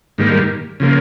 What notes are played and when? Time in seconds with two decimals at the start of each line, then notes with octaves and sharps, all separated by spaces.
0.18 G#2 D#3 G3 A#3
0.80 C#3 F3 A#3